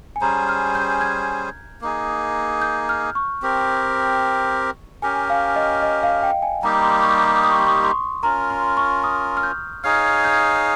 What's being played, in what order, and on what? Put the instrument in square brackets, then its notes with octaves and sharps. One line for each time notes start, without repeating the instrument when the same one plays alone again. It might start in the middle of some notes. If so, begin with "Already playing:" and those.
[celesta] G#5
[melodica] G3 C#4 G#4 C5 [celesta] A#5
[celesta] F6
G6
G#6
[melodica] A#3 D#4 G#4
[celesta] G6
F6
C#6
[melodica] C4 G4 A#4
[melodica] C#4 G4 A#4 [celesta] G#5
[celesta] F5
D#5
D#5
F5
G5
G#5
[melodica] G3 A#3 D#4 G4 [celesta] A#5
[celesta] C6
C#6
D#6
D#6
C#6
C6
C#6
C6
[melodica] C#4 F4 A#4 [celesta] A#5
[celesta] C6
C#6
D#6
F6
G6
[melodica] D#4 G#4 C#5 F5 [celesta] F6
[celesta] G6